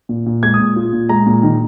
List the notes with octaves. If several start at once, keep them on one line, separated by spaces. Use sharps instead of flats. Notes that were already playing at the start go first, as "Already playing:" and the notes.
A#2
A#2
G#3 G#6
D#6
A#2
F4
A#2
G#3 A#5
A#2
D#3